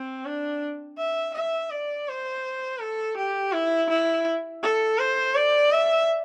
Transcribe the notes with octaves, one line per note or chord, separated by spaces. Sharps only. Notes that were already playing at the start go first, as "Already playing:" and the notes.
Already playing: C4
D4
E5
E5
D5
C5
A4
G4
E4
E4
A4
C5
D5
E5